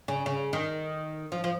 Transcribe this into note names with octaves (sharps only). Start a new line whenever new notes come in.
C#3
C#3
D#3
F3
F3